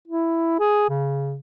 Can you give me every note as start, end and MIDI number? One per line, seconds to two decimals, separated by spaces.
0.08 0.56 64
0.60 0.85 68
0.89 1.37 49